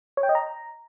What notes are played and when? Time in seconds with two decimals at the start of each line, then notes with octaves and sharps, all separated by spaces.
0.17 C#5
0.23 G5
0.29 D#5
0.35 A#5